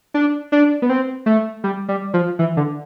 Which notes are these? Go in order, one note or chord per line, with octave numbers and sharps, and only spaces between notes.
D4
D4
B3
C4
A3
G3
G3
F3
E3
D3